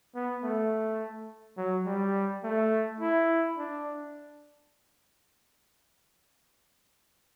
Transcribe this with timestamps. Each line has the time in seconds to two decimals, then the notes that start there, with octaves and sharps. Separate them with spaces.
0.15 B3
0.43 A3
1.58 F#3
1.86 G3
2.44 A3
3.01 E4
3.58 D4